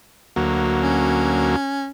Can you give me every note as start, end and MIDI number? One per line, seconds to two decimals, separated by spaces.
0.36 1.56 38
0.36 1.56 54
0.36 1.56 58
0.80 1.91 61